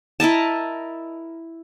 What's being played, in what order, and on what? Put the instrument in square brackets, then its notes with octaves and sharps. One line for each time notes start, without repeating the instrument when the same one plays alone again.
[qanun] E4 A#4 D#5 A5